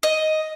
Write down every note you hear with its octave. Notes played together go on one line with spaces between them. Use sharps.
D#5